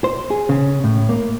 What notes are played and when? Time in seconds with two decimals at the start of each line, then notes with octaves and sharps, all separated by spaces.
0.04 C5
0.30 G#4
0.49 C#3
0.84 A2
1.09 A#3